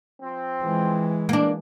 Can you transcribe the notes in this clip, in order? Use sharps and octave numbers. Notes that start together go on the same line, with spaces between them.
F3 C4
E3 G#3
A#3 D4